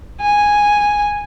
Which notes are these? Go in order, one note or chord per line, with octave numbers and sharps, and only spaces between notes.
G#5